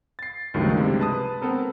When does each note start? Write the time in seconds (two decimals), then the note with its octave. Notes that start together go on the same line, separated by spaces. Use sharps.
0.19 A6 C7
0.54 C#2 G2 D#3 F3 F#3 A3
0.75 C3 G#3 D4
1.00 B4 A5 D#6
1.42 B3 C4 A4 A#4